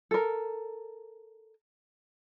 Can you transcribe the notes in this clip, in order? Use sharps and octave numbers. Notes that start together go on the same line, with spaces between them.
A4 A#4